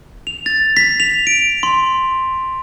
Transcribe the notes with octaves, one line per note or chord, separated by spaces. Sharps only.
F7
A6
B6
F7
D7
C6